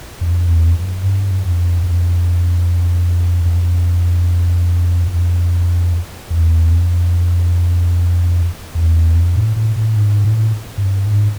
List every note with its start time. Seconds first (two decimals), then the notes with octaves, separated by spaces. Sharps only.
0.21 F2
0.48 E2
0.67 F2
0.74 F#2
1.02 G2
1.31 F#2
1.42 F2
1.83 F2
3.45 F2
5.08 F2
6.30 E2
6.72 F2
8.75 E2
9.15 F2
9.36 A2
9.56 A2
9.76 A2
9.96 G#2
10.24 A2
10.78 G2
11.05 G#2